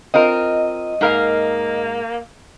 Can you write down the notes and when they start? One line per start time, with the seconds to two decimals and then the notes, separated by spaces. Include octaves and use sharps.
0.14 C4 F4 A#4 D#5
1.01 G#2 A#3 A#4 F5